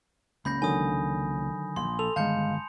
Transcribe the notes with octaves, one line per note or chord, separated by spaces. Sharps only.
C#2 A#3 C#4 B5 G6 A#6
D3 D#3 F#3 G#5 D#6
A#1 C6
A4 F7
G1 D#3 G#3 F5 A5 G6 C#7